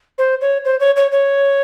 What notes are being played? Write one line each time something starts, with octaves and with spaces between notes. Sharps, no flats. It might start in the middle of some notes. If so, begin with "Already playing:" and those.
C5
C#5
C5
C#5
C#5
C#5